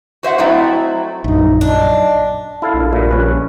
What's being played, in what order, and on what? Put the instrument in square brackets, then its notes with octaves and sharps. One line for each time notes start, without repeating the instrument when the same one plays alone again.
[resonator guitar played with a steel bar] F#4 C5 E5 F#5
F#3 A3 C4 D#4 E4
[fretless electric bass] A#1 F#2 [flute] D#4
[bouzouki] D4 [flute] D#5
[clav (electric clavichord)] E4 A4 F5
[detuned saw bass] A#1
[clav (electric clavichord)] G2 A#2
C#4 B4